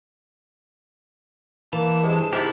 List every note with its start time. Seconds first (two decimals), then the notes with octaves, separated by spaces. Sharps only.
1.73 E3 A#3 A5
2.03 G2 C3 G#3
2.33 G#2 C3 E4 G4 A#4 A5